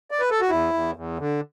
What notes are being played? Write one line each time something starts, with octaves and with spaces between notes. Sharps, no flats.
D5
B4
A4
F#4
E2 E4
E2
E2
D3